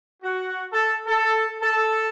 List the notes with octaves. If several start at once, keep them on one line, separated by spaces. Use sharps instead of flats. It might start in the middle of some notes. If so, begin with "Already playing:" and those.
F#4
A4
A4
A4